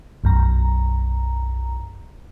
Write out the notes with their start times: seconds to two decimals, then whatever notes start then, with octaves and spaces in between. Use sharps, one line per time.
0.24 B1 F#2 A#5